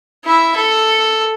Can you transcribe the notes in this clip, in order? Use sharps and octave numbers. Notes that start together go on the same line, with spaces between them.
E4 E5
A4